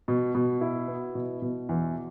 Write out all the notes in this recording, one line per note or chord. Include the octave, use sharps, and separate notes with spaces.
B2
B2
E4
B3
B2
B2
E2